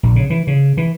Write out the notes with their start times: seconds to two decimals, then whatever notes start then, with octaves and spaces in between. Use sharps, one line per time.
0.03 A#1
0.16 C#3
0.30 E3
0.47 C#3
0.77 E3